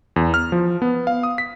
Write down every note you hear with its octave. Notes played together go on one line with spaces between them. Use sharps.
E2
F6
F3
B3
F5
D#6
B6